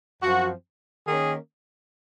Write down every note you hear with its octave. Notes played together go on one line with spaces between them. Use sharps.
F#2 F3 C4 F#4
D#3 A#3 C#4 G#4